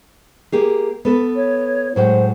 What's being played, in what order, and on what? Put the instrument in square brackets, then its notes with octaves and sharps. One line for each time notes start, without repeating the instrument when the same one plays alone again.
[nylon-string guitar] A#3 G4 G#4
B3 A4 B4
[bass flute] C#5
[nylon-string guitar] A2 F#3 G#3 [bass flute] C5